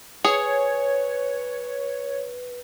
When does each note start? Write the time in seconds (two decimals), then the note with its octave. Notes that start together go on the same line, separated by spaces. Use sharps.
0.25 G#4 B4 C#5